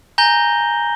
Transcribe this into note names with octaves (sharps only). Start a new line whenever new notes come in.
G#5 A#5 G6 A#6 G7